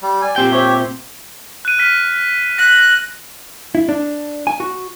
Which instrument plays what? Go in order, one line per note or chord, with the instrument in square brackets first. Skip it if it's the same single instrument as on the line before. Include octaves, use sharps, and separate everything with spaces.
[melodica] G3
[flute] D5 [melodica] G#5
[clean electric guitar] A#2 C4 G5 [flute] G4
[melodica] G4 C#5 E5 [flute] C5
[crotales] F#6 D#7
F6 B6 D#7
[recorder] F#6 [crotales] A#6 B6
[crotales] A#6
[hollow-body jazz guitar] E4
D4
G#5
F#4